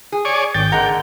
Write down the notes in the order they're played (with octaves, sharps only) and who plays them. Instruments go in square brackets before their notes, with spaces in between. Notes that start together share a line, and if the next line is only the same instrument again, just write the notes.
[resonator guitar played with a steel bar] G#4
[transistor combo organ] C#5 D5 G#5
[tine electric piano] G#1 A6 [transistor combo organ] G5
[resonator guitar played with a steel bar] D3 G#3 A#3 [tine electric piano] F#5 A#5